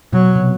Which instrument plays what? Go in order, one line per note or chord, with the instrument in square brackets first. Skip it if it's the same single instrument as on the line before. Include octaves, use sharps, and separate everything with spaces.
[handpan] B2 [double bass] F#3
[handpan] C3